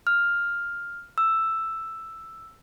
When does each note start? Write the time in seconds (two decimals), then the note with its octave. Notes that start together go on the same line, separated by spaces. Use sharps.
0.07 F6
1.18 E6